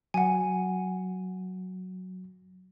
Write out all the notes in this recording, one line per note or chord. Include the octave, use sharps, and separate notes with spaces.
F#3 F#5 G#5